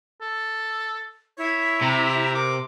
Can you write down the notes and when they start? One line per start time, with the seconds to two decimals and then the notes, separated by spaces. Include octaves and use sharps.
0.21 A4
1.38 E4 C#5
1.82 C3 A#5
2.35 A#4 D6